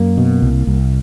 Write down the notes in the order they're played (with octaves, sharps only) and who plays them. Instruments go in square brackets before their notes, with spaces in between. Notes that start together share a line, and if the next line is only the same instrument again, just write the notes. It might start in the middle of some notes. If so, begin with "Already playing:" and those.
Already playing: [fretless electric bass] F#2 A#3
B2
C2
C2